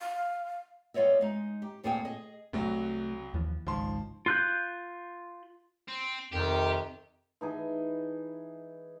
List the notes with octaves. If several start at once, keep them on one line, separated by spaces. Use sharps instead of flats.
F5
G3 B3 F4 C#5 D#5 E5
G#3 D#4
G4
D2 A#2 C4 G#4 F5 G5
G#4 D#5
C2 C3 F#3 A3 F#4
D#2 E3 F3
G#1 C#2 D#3 F3 C6
F4 F#6 G6
C4
F2 C3 D#3 G4
E3 D#4 G#4